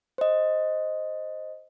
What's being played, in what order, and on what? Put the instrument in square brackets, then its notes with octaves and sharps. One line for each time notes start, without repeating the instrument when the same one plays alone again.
[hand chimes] C5 D#5